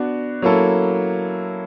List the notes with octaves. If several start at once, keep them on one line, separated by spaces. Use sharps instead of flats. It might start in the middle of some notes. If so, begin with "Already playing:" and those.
Already playing: B3 D4 F#4
F#3 A#3 C#4 E4 A4